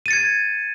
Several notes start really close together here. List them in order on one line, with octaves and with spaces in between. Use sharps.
D#7 A6 C#7 G#6